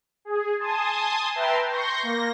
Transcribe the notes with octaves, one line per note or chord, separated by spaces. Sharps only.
G#4
G#5 A5 C6 D#6
B4 E5 G5 A5 A#5 C6
C6 C#6 G6 A#6
A#3 A#6